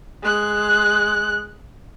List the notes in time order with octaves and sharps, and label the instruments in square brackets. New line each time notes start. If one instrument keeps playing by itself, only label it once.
[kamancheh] G#3 F#6